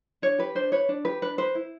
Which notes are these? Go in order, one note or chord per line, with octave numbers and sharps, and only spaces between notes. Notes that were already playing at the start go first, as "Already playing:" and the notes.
D4 C#5
G4 B4
D4 C5
B4 C#5
D4
G4 B4
D4 B4
B4 C5
E4